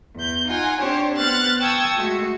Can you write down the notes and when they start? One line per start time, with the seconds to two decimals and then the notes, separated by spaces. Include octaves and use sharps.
0.16 E2 G6
0.47 D#4 F4 F#5 G#5
0.80 C4 D4 G4 C5 C#5
1.16 B3 C5 F6 F#6 A6
1.60 G5 A5 C#6 D#6 E6 G#6
1.97 G#3 A3 F#4